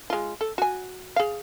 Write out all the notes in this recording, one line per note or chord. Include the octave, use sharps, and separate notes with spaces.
G#3 F4
A4
F#4 G#5
G#4 F5